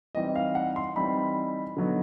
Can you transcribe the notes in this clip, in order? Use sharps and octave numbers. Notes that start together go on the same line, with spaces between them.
E3 G3 C4 D#4 D#5
F5
F#5
C6
E3 G3 C4 D#4 B5
D3 F#3 B3 D#4